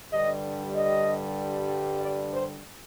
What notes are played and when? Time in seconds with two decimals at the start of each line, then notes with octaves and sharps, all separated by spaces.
0.11 G2 D3 G3 D#5
0.75 D#5
2.01 D5
2.33 C5